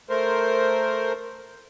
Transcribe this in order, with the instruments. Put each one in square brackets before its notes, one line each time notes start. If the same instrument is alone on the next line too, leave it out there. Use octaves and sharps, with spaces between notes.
[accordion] A3 A#4 C5